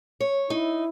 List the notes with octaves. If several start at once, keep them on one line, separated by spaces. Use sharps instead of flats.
C#5
D#4 E4